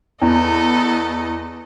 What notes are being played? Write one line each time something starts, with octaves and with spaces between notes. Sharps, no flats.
E2 B3 A4 D#5